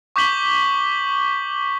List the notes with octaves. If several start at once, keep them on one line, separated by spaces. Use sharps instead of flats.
C#6 D6 G6 B6 F#7 G7